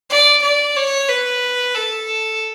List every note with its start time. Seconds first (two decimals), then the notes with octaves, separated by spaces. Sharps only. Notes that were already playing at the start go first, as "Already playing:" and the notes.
0.09 D5
0.42 D5
0.76 C#5
1.09 B4
1.75 A4